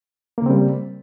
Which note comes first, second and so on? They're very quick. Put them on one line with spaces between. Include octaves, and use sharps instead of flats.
A#3 C#3 C4 G3